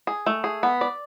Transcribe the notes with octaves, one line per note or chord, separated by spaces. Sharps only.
G#4
A3
G#4
B3
D5